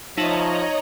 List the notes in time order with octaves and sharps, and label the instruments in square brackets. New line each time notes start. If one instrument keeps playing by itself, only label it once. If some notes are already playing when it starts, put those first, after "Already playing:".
[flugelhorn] F3 [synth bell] D#4 F#7 [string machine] C#5 D#5 A#5 [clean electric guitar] E5 A5